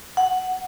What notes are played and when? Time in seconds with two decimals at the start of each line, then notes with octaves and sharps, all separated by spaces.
0.17 F#5